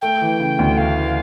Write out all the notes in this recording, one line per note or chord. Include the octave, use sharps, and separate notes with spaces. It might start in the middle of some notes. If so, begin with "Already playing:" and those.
A3 G5
E3
C#3
D2
A3 F5
E3